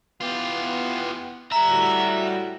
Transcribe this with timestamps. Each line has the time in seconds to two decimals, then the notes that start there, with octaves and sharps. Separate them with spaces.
0.21 E3 B3 F4 G4
1.52 G3 E5 A#5
1.70 A2 F#4